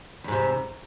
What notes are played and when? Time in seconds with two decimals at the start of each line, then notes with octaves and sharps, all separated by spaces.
0.24 E2
0.28 G#2
0.32 C3